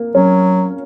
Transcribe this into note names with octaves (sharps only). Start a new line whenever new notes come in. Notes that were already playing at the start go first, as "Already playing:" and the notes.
Already playing: A#3
F#3 C#4